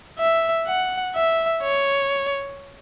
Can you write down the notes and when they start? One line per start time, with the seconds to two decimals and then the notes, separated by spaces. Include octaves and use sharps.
0.19 E5
0.67 F#5
1.16 E5
1.63 C#5